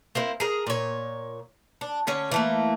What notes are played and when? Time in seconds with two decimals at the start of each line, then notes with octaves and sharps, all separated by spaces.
0.15 A#3 C4 E4
0.40 G#4 A#4
0.67 A#2 C#5
1.81 D4
2.07 D3 C#4 C#5
2.31 E3 A3 A#3